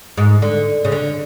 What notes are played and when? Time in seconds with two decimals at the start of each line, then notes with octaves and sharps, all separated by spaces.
0.17 G#2
0.42 D3
0.85 C#3
0.92 D3